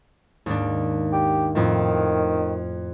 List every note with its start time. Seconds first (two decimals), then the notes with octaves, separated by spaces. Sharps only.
0.46 D#2 G#2 D4
1.13 G4
1.55 F2 A2 D#3